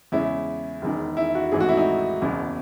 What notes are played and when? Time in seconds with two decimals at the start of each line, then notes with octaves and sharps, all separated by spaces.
0.12 E2 C#3 G#3 C#4 E4
0.82 E1 E2 D#3
1.17 E4
1.35 F#4
1.52 G#1 G#2 E3 A3 G#4
1.60 F#4
1.69 E4
1.77 D#4
2.22 F#1 E2 B2